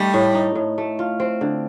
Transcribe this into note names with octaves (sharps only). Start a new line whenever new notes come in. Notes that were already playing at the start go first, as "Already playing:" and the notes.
Already playing: G3 A3 D#4
A2
D#4
A2
A3
F4
C4
D3